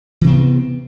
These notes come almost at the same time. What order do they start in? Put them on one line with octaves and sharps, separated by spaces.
E3 C3 C4 B3